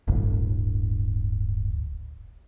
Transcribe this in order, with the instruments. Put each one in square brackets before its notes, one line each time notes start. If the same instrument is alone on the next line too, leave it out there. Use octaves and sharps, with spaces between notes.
[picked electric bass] D1 G1